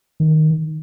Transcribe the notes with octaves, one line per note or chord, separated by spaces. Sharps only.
D#3